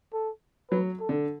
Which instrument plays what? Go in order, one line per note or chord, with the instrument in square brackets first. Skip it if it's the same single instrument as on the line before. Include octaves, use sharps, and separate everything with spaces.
[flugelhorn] A4
[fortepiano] F#3 [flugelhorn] B4
[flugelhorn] A4
[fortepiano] D3